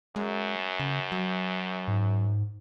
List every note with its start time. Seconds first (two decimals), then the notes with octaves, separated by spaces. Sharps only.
0.16 F#2 G#3
0.80 C#3
1.12 F#3
1.87 G#2